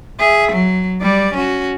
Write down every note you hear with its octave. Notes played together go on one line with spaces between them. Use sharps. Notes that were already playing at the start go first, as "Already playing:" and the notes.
G#4 E5
F#3
G3 D5
C#4 F#4